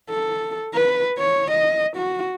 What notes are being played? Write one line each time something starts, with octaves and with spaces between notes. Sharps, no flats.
A4
B4
C#5
D#5
F#4